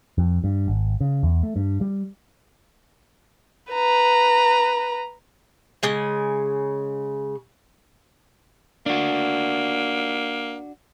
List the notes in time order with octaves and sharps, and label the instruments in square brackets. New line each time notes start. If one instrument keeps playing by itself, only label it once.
[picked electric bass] F2
G2
G#1
C#3
E2
A3
G2
G3
[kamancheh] B4 A#5
[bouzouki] C#3 G#3 G#5
[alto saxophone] A#3 [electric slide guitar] D4 F#4